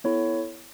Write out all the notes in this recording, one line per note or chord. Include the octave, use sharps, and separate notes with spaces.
B3 E4 A4 C#5